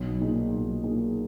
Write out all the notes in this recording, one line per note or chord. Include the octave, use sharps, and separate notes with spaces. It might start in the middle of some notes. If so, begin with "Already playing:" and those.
Already playing: B1
A#2 A#3 D#4 G#4
B1
A#2 A#3 D#4 G#4